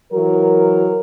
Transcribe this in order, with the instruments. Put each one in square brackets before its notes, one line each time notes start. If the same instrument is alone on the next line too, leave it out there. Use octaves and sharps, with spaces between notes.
[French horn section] E3 F#3 A#4